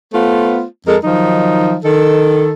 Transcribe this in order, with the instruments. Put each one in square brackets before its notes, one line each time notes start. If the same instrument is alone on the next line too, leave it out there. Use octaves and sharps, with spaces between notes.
[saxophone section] A3 B3 F4 C5
F2 G#3 A4 A#4
D#3 F3 F#3 D#4
D#3 A4